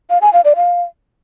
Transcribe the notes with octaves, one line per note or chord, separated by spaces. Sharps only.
F5
G#5
F5
D5
F5